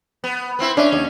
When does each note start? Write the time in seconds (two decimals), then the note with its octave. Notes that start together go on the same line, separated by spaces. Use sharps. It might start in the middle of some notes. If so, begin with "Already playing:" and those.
0.24 B3
0.59 B3 C4 E4
0.77 C#4 D4 E5
0.92 D#2